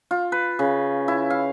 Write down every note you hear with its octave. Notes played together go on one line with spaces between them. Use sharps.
F4
B4
C#3
E4
F5